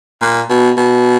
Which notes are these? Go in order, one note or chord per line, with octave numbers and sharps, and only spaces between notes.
A#2
B2
B2